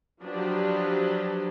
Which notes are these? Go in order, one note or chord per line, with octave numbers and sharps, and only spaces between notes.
F3 F#3 D4 G4 B4